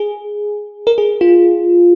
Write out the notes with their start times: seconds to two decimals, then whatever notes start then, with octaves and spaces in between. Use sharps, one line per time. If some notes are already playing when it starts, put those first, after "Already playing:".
Already playing: G#4
0.87 A#4
0.98 G#4
1.21 F4